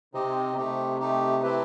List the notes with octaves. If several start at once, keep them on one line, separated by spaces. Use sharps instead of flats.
C3 C4 D#4 G4 D#5
C3 A3 D#4 G4
A3 D#4 G4
A3 C4 E4 G4 B4